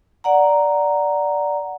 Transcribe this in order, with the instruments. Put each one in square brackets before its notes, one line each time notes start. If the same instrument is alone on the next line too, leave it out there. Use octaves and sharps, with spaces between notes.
[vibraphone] D5 F#5 A#5